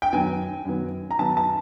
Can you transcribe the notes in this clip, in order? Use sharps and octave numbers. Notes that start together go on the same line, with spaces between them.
G5
F#2 D#3 F#3 B3 G#5
F#2 D#3 F#3 B3
A#5
F#2 D#3 F#3 B3 A5
A5